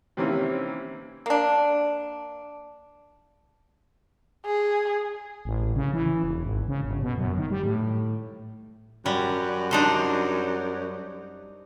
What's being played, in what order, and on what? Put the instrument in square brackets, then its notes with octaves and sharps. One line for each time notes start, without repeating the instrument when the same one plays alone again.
[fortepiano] C3 D#3 E3 A#3 C4 C#4
[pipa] A#3 D4
[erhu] G#4
[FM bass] A1
C#3
E3
E1
G#1
C#3
G1
B2
F#2
D#3
G3
A2
[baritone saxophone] F#2 [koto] G3
[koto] D4 D#4 C5